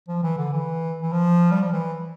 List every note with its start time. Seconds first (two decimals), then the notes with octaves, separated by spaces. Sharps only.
0.08 F3
0.23 E3
0.38 D3
0.53 E3
1.02 E3
1.12 F3
1.51 G3
1.62 F3
1.73 E3